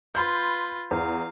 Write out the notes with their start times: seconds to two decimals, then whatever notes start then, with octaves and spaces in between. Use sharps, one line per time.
0.15 F4 B4 B5 C6 G6
0.91 E2 F5